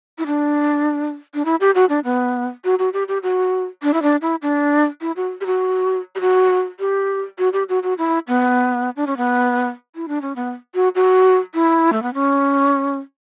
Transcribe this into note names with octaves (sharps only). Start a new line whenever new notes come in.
E4
D4
D4
E4
G4
F#4
D4
B3
F#4
F#4
G4
G4
F#4
D4
E4
D4
E4
D4
E4
F#4
G4
F#4
G4
F#4
G4
F#4
G4
F#4
F#4
E4
B3
D4
C#4
B3
E4
D4
C#4
B3
F#4
F#4
E4
A3
B3
C#4